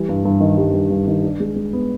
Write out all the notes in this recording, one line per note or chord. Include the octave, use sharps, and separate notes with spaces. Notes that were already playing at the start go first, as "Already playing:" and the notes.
Already playing: E3 G3
G2
G2
D#3
G3
G2
G2
D#3
D4
G#3
G#3
B3